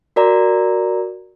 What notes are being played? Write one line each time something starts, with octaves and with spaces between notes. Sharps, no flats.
F#4 A#4 D5 A#5